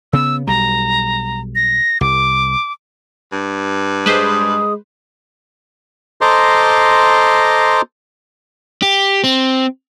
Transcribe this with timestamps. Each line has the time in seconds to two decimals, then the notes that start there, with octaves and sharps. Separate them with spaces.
0.13 C#3 B3 E6
0.47 B1 G3 A#5
1.55 A#6
2.01 C2 D6
3.32 G2
4.06 G#3 B4 C5 D#6
6.21 A4 C5 D#5 A#5 C6 D6
8.82 G4
9.24 C4